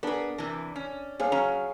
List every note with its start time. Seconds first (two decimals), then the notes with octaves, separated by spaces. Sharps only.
0.03 B3 D4 G#4 A#4 D6
0.38 C3 E3 A5
0.76 C#4
1.20 G2 G#4 C#5 F5
1.32 F#3 C#4 A#5